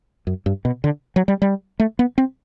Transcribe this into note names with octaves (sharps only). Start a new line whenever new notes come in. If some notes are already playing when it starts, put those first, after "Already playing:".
F#2
G2
B2
D3
F#3
G3
G3
A3
B3
C4